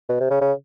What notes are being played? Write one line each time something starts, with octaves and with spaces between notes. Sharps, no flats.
B2
C3
C#3
C#3